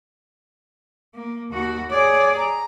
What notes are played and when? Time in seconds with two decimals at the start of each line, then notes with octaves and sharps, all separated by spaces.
1.14 A#3
1.51 D#2 F#4
1.90 G#4 C#5 D5
2.36 A#5